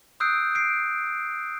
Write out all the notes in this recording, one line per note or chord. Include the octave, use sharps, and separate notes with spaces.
D#6 E6 F#6 G6 C7 D7
C7 D7